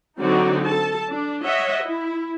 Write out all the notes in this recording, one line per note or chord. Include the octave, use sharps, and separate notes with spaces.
D3 F#3 C4 D#4 F#4 D5
A4 A5
D4
C#5 D#5 E5 F#5
E4